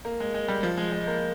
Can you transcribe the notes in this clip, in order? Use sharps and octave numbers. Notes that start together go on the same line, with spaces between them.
A#3
G#3
G#3
G3
F3
G#3
G#3
A#3